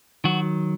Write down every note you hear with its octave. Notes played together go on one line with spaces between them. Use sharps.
D#3 F#3 F#4